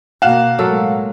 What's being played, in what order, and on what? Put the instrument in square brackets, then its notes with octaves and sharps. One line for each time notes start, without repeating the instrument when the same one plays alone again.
[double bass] B2 A#3 [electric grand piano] F5 [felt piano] F#5 F#6 E7
[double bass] A2 G#3 [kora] F#3 A#3 A4